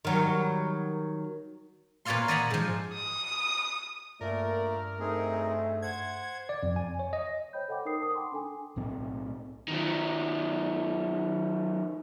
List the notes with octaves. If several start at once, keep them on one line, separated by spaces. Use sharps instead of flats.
D#3 F#3 G3
A#2 B4 C#5 D5 F5 C6
D5 D#5 F#5 G#5 A#5 B5
G#2 F3
D#6
G2 A#2 A3 A#4 D5
A3 C4 D#4 G#4
C5 F#5 G#6
D5
F2
G#5
C#5
D#5
C5 C#5 G5 B5 G6
A4 D#5 F#5 G5 B5 D6
D#4 A#4 C5 D#6 C7
A5 D#6
F#5 G5 A5 B5 C6 D6
D4 A4 G#5
B1 A2 C4
D#3 F#3